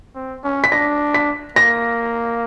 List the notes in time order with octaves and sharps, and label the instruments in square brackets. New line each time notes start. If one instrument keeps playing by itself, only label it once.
[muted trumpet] C4
C#4
[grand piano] B6
[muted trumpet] D4 [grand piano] A#6
[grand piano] B6
[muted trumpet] A#3 [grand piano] A#6